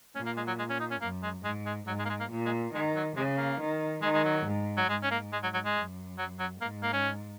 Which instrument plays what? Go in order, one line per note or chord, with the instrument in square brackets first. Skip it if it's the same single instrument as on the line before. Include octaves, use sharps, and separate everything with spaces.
[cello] A#2 [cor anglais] C#4
[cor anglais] A#3
G#3
F#3
G#3
C#4
D#4
C#4
[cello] F#2 [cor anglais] A#3
[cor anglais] G#3
[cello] G#2 [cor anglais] G#3
[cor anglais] G#3
[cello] G#2 [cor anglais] F#3
[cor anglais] G#3
A#3
G#3
A#3
[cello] A#2
[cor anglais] G#3
[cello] D#3 [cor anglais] G#3
[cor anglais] F#3
[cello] C#3 [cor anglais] G#3
[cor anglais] A#3
[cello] D#3
[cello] D#3 [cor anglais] G#3
[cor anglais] G#3
F#3
[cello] G#2
[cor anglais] F#3
[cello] G#2 [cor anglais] G#3
[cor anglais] C#4
A#3
G#3
F#3
F#3
G#3
[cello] F#2
[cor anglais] F#3
F#3
[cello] G#2 [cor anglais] A#3
[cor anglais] A#3
C#4